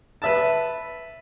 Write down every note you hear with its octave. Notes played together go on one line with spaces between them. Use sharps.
B4 E5 A5